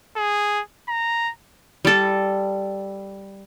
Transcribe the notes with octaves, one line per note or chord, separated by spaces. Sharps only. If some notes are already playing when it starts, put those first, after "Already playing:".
G#4
A#5
G3 A4